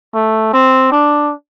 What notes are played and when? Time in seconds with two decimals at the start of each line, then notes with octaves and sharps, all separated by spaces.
0.14 A3
0.53 C4
0.92 D4